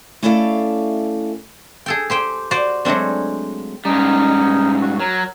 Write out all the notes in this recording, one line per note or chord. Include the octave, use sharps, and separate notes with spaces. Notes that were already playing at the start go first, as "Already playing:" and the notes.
A3 C#4 E4 A4 D5 F5
G#4 A4 G5
G4 C5 G5
F#4 C5 D5
F#3 G#3 A3 C4 D4
G#2 G3 C#4 D#4
F#4
F#3 A#4